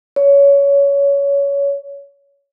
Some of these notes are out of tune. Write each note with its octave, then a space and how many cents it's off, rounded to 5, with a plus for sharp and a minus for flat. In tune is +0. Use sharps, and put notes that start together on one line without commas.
C#5 +20